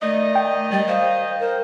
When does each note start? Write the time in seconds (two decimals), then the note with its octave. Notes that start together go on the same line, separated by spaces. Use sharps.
0.02 D#3 A3 D#4 D5 D#5
0.35 G5
0.72 G3 D5
0.88 C5 F5
1.40 A#4 C5